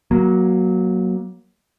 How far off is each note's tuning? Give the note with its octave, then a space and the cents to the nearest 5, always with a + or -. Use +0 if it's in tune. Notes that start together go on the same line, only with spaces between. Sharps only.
F#3 +0 A#3 +15